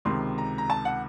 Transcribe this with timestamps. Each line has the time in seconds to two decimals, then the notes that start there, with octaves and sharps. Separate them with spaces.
0.05 C#2 C3 D#3 C6
0.38 A#5
0.58 A#5
0.70 A5
0.85 F#5